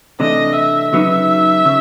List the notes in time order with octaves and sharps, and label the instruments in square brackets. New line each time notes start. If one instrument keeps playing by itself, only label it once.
[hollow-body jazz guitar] C3 E3 A3 D4 [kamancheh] D#5
[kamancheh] E5
[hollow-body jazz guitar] C#3 F#3 B3 D#4
C#3